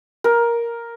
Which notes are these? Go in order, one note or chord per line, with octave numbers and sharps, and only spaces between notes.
A#4